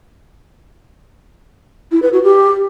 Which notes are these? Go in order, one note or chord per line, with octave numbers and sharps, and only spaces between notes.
E4
B4
F#4
G4